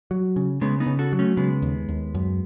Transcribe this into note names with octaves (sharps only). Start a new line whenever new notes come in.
F#3
C#3
C#3 G#3 B3
B3 D#4
C#3
F#4 A4
F#3
A3 C#4
C#3 G#3 B3
D#2
D#2
F#2